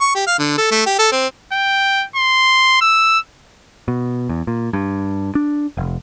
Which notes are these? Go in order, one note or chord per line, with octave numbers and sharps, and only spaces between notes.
C#6
G4
F5
D3
A4
A3
G4
A4
C4
G5
C6
E6
B2
E2
A#2
G2
D4
F1